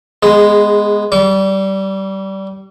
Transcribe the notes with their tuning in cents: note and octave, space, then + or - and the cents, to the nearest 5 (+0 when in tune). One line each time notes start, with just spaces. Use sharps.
G#3 +0 B3 +0 G#4 -25
G3 -20 D6 -40